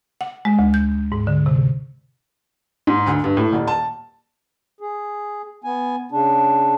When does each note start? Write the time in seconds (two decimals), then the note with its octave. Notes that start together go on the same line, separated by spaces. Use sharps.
0.21 F#5
0.45 G#3
0.59 D2
0.74 G6
1.12 G#2
1.27 D3
1.46 C3
2.87 G#2
3.06 D2
3.24 G2
3.37 A2
3.52 D#1
3.68 A5
4.80 G#4
5.64 B3 G#5
6.11 C#3 D4